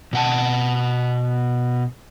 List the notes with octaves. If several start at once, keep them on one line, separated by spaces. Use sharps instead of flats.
B2 F#5 A5